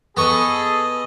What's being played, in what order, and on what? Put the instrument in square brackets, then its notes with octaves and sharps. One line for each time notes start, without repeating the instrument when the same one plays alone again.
[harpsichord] B3 C#6 [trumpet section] G#4 A4 [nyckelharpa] D#5